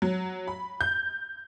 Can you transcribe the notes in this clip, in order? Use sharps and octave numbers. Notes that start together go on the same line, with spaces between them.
F#3
B5
G6